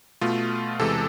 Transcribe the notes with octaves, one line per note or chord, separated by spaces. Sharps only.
B2 A3 F4
E2 C3 E3 G#3 A4